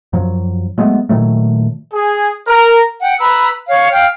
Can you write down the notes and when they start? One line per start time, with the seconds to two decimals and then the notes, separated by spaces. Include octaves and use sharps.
0.13 F#2 F3 F#3
0.78 F#3 G#3 A3 B3
1.09 A#2 D#3 F#3 A3
1.94 G#4
2.47 A#4
3.01 F#5 G5
3.19 B4 A#5 B5 E6
3.67 C#5 F5
3.92 F5 G5